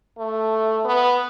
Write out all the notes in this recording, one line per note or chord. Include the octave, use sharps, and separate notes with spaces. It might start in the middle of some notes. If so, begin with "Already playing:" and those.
A3
B3